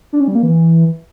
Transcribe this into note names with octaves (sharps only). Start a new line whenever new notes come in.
D4
C#4
G3
A#3
E3